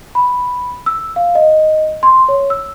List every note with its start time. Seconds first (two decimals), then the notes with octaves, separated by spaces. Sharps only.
0.15 B5
0.86 E6
1.16 F5
1.35 D#5
2.03 C6
2.29 C#5
2.50 E6